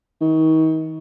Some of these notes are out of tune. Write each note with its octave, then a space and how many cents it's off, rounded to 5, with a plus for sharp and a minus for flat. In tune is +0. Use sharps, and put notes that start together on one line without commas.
D#3 +35